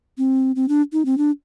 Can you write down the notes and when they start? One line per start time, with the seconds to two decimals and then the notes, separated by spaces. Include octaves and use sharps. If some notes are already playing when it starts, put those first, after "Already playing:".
0.18 C4
0.56 C4
0.68 D4
0.93 D#4
1.06 C4
1.18 D4